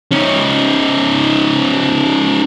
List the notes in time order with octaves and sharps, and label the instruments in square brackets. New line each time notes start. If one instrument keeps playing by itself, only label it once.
[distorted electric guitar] C#4 D#4